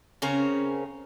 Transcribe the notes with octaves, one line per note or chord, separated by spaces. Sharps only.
C#3 C4 C#4 A#4